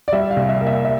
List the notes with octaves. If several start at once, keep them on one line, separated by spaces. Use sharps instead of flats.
D5
G3 E5
F5
C2
E5
A#3
E5
E5